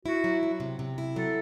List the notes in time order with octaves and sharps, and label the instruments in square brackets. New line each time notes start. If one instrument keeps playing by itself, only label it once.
[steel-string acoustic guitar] E4 [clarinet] F#4
[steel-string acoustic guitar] F#3
F#3
C3
C3
E4
[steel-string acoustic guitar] F#3 [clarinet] A4